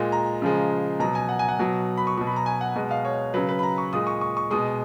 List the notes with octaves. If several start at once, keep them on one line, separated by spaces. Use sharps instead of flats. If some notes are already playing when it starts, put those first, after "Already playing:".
Already playing: A#2 G#3
A#5
C#3 F3 G#3
B2 F#3 A#5
G#5
F#5
G#5
F#5
B2 F#3
B5
C#6
B2 F#3 C#6
B5
A#5
G#5
F#5
B2 G#3 F#5
F5
C#5
C#3 F#3 B4
B4
B5
A#5
C#6
A#2 G#3 D#6
C#6
C#6
C#6
B2 G#3 D#6